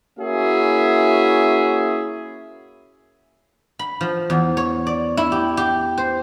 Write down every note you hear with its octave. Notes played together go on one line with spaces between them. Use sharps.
A#3 C#4 E4 F#4 G#4 E5
B5
F3
E2
C#5
D5
E4
G4
G4
C5